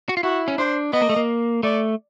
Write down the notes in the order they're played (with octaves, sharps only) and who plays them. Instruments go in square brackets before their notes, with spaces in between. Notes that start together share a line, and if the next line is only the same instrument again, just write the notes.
[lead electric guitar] F#4
F4
[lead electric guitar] E4 [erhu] F#4
[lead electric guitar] C#4
[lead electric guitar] D4 [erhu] C5
[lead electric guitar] B3 [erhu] D#5
[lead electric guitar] A#3
A3
A#3
[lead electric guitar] A3 [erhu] D5